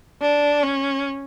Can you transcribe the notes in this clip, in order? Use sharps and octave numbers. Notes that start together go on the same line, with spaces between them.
D4
C#4